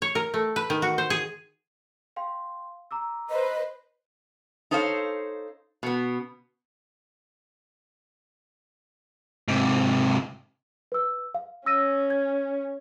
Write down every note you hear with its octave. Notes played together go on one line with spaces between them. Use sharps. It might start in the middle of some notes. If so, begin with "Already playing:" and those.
C#5
A#4
A3
B4
D#3
F#4
C5
G#4
F5 G5 C6
A#5 D6 E6
B4 C5 D#5
D#4 A4 C5 C#5 F5
B2 B3
G#2 C3
B4 E6
F5
C#4 E6 A#6 D#7
G#6